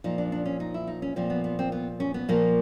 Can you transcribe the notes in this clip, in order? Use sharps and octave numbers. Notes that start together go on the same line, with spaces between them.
A#2 F3 D#4
D4
D4
C#4
D#4
E4
D#4
C#4
A#2 F3 C4
B3
B3
C4
B3
C#4
B3
A#2 F3 A#3